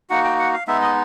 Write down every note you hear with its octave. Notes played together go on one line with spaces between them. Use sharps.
A#3 D#4 F#4 F#5
G5
F#5
F5
G#3 B3 D#4 E5
D#5